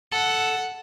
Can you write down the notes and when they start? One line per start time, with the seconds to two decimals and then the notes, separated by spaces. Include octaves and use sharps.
0.12 A4 F#5